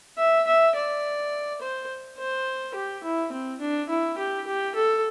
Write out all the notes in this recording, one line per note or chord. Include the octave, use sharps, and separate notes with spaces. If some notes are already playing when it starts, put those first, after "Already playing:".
E5
E5
D5
C5
C5
G4
E4
C4
D4
E4
G4
G4
A4